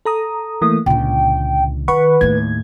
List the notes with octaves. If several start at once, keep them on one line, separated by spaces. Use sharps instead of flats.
A4 A#5 D#6
E3 A3 A#3 D#6
C#2 A#2 D3 G5
D#3 B4 F#5 B5 C#6
D#2 A2 G#6